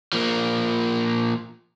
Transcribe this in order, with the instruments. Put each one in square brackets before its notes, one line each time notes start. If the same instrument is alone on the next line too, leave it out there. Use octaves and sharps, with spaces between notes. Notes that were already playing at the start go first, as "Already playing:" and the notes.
[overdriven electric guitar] F3 A#3